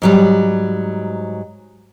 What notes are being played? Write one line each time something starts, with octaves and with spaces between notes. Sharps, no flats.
G#2 F#3 G3